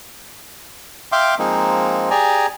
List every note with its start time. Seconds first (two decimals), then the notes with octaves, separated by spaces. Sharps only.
1.12 E5 F5 G5 C6 D6
1.39 F3 G#3 A#3 C4 D#4
2.10 G4 G#4 D5 G#5 A#5